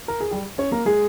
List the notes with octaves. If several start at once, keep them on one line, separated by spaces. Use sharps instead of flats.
A#4
G#4
G3 G4
C#4 C#5
A#3 A#4
G#3 G#4